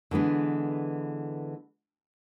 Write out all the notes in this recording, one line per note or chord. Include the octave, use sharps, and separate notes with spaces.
D3 E3 G#3 B3